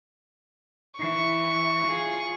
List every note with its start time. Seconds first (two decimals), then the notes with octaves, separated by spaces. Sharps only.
0.99 E3 C#6
1.88 F4 G#4